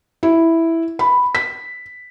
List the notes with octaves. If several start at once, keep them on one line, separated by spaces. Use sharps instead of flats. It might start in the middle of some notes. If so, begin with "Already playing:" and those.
E4
B5
B6